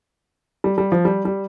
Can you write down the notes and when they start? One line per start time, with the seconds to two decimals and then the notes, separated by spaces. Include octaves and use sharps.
0.64 G3
0.78 G3
0.92 F3
1.05 G3
1.25 G3